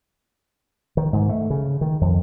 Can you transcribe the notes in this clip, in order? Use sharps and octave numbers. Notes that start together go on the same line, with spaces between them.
D#3
G#2
A3
C#3
D#3
F2